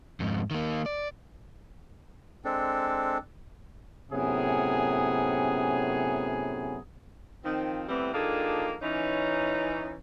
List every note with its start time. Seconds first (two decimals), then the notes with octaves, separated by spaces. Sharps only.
0.20 F2 G#2
0.51 D#3 A#3
0.86 D5
2.45 G#3 C4 D4 A4
4.12 F#2 A2 C3 B3 C#4 G#4
7.45 D#3 F3 C4
7.88 A2 C3 E3 G3 B3 C4
8.14 D#3 F3 A#3 D4 G#4 A4
8.82 E3 C#4 D#4